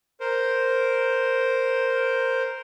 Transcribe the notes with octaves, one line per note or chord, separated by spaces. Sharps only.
A#4 C5